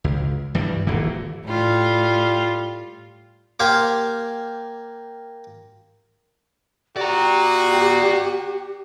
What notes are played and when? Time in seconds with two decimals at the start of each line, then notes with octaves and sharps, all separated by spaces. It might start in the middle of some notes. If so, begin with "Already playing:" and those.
0.04 C#2
0.55 G2 E3 G3
0.87 D#1 G#1 A#2 E3
1.44 A2 G3 F4
3.60 A#3 G4 C5 F5 G5 G#5
6.97 F#4 G4 D5 A#5